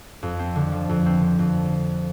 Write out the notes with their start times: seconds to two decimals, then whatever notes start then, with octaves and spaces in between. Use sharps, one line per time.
0.23 F2
0.39 C4
0.55 D3
0.72 F3
0.89 F2
1.06 C4
1.22 D3
1.39 F2